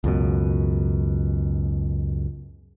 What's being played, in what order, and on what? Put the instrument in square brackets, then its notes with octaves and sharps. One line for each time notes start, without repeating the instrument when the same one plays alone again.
[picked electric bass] C#2 F#2 B2